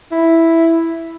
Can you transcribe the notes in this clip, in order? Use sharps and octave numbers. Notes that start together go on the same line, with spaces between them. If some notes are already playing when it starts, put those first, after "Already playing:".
E4